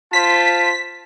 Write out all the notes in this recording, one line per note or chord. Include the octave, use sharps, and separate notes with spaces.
F4 C5 A5 B6